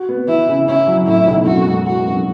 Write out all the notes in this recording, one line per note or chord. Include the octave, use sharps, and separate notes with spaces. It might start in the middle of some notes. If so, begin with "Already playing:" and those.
Already playing: F#4
B3
E3 E4
C#3
C#4 E4
F#3
A2 E4
B1
F#2 F#4
G#3
E3 F#4
F#2